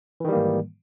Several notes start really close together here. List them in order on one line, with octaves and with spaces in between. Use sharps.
E3 D#3 G3 A#3 G#2